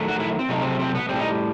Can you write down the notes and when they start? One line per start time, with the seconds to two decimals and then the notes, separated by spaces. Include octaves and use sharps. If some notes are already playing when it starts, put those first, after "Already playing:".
Already playing: D#3 F#3 A3
0.08 F#4
0.20 E4
0.39 C4
0.49 C3 F#3 A3 D#4
0.61 C4
0.80 C4
0.95 B3
1.09 A2 G3 C4
1.19 D#4